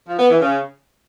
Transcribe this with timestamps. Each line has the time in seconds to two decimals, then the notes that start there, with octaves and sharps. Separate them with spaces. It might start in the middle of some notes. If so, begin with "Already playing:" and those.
0.07 F3
0.18 B3
0.29 E3
0.40 C#3